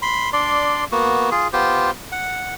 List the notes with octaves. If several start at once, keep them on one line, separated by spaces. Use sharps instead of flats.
B5 C6
D4 D5 C6
A#3 B3 F#4
F4 G#4
B3 F4 G4 C5
F#5